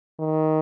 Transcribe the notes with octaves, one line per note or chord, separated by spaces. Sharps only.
D#3